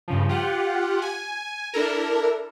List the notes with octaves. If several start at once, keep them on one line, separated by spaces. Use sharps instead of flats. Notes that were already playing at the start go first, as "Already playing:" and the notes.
G2 C#3 F3
F4 G4 F#5
G#5
D4 E4 A4 A#4